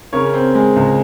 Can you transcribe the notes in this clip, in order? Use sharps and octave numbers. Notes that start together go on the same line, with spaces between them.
C#3 A#4 C#5
C4
G#3
C#2